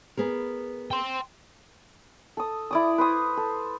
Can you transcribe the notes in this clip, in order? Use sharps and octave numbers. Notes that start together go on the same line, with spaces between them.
B3 G#4 A#4
G5 C6
A4 D#6
E4 D5 D#6
B4 C5 D#6
A4